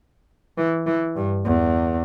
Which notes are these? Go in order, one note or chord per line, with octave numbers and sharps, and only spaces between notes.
E3
E3
G2
E2